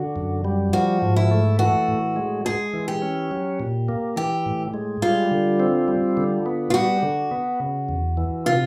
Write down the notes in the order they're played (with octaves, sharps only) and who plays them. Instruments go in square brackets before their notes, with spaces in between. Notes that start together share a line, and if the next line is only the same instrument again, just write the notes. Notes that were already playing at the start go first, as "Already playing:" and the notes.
Already playing: [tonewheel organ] D3 [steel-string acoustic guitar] F#4
[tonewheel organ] F#2
G3
[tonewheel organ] F3 [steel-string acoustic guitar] F#4
[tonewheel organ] G#2
[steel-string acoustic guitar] E4
[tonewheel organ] A3
[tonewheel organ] E3 [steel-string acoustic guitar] F#4
[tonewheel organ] A2
G#3
[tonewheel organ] G#3 [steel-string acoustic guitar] G#4
[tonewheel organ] E3
[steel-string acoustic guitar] G4
[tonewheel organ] C#4
F#3
A#2
A#3
[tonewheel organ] E3 [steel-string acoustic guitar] G4
[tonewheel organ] A2
G#3
[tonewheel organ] G3 [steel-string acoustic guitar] F4
[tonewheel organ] D3
C4
G3
D3
B3
[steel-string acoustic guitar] F4
[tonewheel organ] G3 [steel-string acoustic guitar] F#4
[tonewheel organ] D3
B3
C#3
E2
E3
[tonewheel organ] C3 [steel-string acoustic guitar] F4